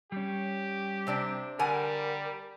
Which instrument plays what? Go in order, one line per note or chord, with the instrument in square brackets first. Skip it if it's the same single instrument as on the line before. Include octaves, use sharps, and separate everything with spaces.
[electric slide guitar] G3 C#4 [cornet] G4
[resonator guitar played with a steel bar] C3 C4 D4
[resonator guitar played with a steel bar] D3 F#5 G#5 [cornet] G3 [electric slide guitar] A#4